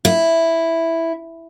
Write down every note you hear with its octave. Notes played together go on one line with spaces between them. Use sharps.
E4